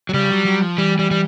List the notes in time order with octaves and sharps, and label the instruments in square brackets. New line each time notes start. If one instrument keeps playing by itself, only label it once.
[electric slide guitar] F#3
[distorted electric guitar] C#3 [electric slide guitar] G3
[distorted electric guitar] F#3
F#3
F3
[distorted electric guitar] E3 [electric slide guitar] G3
[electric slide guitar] G3
G3